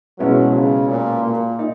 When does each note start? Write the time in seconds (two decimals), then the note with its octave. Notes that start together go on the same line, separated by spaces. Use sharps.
0.19 B2 F#3 G#3 C#4 E4 B4
0.55 C#3
0.88 A#2
1.24 A#2
1.59 D#4